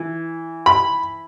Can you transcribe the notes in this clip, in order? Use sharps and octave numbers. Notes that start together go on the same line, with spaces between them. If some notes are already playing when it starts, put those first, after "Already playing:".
Already playing: E3
B5